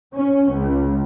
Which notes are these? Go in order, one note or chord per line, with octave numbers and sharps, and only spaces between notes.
C#4
C#2